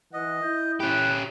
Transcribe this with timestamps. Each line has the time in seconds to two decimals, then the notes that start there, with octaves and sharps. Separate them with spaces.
0.13 E3 D#5 F#5
0.44 E4 G6
0.80 C#4 G4 G5 B5 F#6